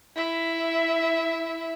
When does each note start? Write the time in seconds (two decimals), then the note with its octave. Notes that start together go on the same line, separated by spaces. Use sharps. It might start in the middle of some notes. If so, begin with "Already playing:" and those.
0.16 E4 E5